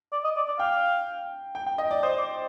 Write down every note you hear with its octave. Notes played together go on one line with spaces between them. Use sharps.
D5
D#5
D5
D5
F5 G5
G5
G5
D#5
D5
C5 D#5
D5